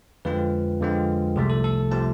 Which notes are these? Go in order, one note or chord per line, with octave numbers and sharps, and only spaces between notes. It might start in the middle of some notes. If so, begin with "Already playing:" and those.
F2 D3 G#3 C4 F4 B4
F2 D3 G#3 C4 F4
C2 C3 F3 A3 G#4
A4
A4
C3 F3 A3 A5